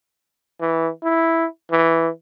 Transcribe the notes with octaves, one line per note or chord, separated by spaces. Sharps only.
E3
E4
E3